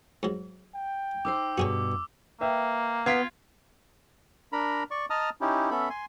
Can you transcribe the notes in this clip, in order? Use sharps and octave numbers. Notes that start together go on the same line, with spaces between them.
G#2 F#3
G5
D#4 B4 C5 D6 E6
G2 B2 F#4 G#4 C#5
A#3 B4 E5 G5
B3 F4 F5 G5 G#6 B6
D4 A#4 A#5 B5
D5 C#6
D#5 A5 A#5 D#6 F6
C#4 D#4 E4 G4
B3 C#4 A4 E5 B5
G#5 C6